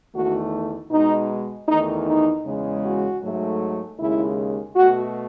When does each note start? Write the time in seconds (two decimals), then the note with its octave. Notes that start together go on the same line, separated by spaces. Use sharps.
0.14 E2 D#3 A3 F#4
0.91 B2 G#3 D#4
1.67 E2 D#3 A3 D#4
2.06 D#4
2.45 E2 C#3 G#3
2.84 F#4
3.22 G#2 F#3 A3
3.98 D#2 C#3 G#3 E4
4.75 B2 A3 F#4